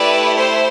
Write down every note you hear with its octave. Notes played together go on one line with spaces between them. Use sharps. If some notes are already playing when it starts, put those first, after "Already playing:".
Already playing: A3 E4 G4 B4 D5
C5